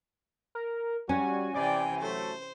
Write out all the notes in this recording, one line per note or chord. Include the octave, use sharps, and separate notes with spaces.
A#4
G3 C#4 F#4 G#5
C3 E3 D5 G5
F#3 A3 C5